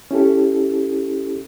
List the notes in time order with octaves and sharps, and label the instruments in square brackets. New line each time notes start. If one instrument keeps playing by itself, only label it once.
[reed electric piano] C#4 E4 G4 A4